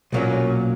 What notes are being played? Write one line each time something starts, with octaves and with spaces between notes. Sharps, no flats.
B1 A#2 F#3 A#3 C#4